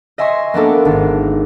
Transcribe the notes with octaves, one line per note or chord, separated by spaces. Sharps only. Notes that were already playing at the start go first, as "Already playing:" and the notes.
D#5 E5 G#5 C6 C#6
A#3 B3 D4 A4
G#1 D4